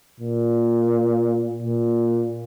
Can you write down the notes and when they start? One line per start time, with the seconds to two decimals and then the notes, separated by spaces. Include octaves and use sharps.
0.20 A#2
1.62 A#2